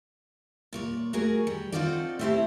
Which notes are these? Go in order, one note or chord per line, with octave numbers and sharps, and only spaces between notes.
A#2 C#5 D5
A3 F#4 G#4 A#4
G3
C4 D#4 F4 F#4 A4 D5
A3 C4 E4 G4 C5 A5